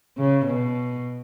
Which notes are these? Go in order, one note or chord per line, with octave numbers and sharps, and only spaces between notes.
C#3
B2